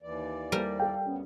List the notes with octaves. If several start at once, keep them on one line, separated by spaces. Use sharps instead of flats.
D#2 E3 D5
G3 A#3 A#4 C5
A4 F5 G5
D2 G2 B3 C#4